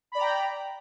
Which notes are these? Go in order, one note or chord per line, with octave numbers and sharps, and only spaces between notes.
D5 G5 A#5 B5